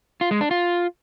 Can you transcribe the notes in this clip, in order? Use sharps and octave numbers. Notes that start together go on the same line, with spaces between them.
F4
G#3
D4
F4